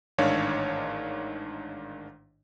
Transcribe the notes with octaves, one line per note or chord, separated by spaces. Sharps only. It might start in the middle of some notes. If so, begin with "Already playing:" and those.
A1 G#2 D#3 D4 C#5 F5